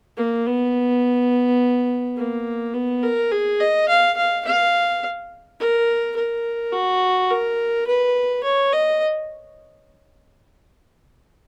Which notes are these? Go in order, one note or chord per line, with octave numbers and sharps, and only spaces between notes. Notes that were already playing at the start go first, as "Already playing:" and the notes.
A#3
B3
A#3
B3
A#4
G#4
D#5
F5
F5
F5
A#4
A#4
F#4
A#4
B4
C#5
D#5